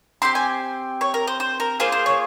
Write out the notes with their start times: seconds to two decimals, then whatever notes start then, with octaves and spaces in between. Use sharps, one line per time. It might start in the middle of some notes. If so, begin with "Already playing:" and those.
0.22 C4 G4 C6
0.35 G#5
1.01 C#5
1.14 A#4
1.27 C5
1.40 C5
1.60 A#4
1.80 A#3 F4 G#4 C5
1.92 C5
2.06 C#5